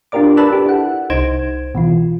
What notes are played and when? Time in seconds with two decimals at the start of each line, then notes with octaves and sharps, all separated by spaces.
0.12 D4 F4 G4 A#4 D5 D6
0.37 B4 D5 A5 B5 E6 F#6
0.51 D4 G4 A4
0.66 E4 F#5
1.10 C2 D#4 C5 G#6 D7 E7
1.75 B2 E3 F4